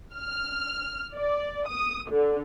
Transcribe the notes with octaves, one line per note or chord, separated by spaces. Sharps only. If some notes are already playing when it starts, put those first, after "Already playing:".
F6
D5
D#6
D3